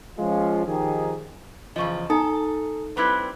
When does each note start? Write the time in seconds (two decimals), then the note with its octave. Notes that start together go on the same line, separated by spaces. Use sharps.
0.19 F3 G#3 C#4 F4
0.66 D#3 F3 D#4 G4 G#4
1.76 E2 C#3 F3 D#5 C#6
2.10 D#4 A4 G#5 A#5 D#6
2.97 G3 C4 E4 B4 B5 G#6